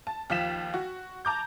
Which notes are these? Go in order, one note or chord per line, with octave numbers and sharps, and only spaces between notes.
A5
D#2 F3 F5 B6 E7
F#4
A5 A#5 D6 G6